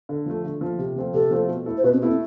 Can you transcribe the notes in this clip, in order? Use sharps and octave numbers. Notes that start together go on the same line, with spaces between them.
D3
F3 A3
D3
F3 A3
C3
F3 A3 C4 F4
C3 A4
F3 A3 C4 F4
B2
A3 E4 A4
C5
B2 B4
C4
A3 B3 E4 A4
C4